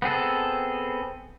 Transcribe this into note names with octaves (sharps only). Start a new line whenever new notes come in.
B3 C4 G#4 A4